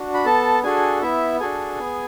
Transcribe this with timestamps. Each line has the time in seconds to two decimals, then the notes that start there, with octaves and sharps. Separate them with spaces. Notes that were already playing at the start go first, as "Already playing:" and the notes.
Already playing: D4 F#4
0.14 B5
0.25 B3 A4 A5
0.63 D4 F#4 G#4 A4 G#5
1.02 B3 E4 E5
1.40 D4 F#4 G#4 A4 G#5
1.79 B3